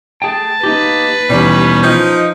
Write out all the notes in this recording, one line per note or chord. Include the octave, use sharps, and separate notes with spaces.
A3 G#4 G5 A5
A#3 D#4 G4 B4
D#2 B2 E3 G3 C#4
F3 D#4